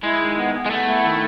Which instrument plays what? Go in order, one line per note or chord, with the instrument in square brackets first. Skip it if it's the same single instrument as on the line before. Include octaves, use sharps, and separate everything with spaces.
[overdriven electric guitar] G#3 [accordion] E4
[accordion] D#3
B3
B3
[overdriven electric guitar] G#3
[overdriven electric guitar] A3 [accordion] B3
[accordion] E4
D#3